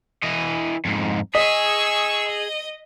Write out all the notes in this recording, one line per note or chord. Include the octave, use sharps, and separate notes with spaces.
E3 D#5
F2 G#2
G#4 D#5 C#6 E6 B6
D#5